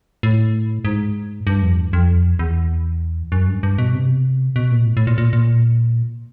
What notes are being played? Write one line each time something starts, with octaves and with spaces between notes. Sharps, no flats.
A2
G#2
G2
F2
E2
F2
E2
F#2
G2
G2
B2
C3
B2
A#2
A2
A2
A#2
A#2
A#2